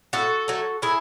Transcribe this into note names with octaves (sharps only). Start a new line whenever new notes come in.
A2 F#4 A4
F#3 A3
A2 E4 G#4